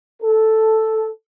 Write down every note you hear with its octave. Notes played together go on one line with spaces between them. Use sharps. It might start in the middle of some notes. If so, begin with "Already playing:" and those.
A4